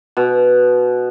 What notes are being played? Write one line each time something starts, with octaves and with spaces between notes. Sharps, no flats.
B2